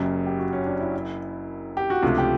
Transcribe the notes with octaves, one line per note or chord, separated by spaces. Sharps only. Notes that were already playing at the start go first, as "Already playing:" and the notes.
Already playing: F#1 F#2 C#3 G4
G4
F#4
C#4
D4
E4
G4
F#4
C#2 C3 F3 A3 D4 F4
G4